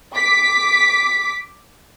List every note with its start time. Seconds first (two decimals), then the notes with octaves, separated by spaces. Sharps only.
0.15 D6 B6